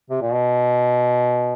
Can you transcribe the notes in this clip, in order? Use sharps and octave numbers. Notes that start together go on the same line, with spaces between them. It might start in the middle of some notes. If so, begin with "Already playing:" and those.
C3
A#2
B2